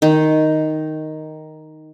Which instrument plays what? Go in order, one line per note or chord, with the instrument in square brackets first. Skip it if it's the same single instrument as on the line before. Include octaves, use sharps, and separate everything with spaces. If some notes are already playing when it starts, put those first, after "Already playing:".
[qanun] D#3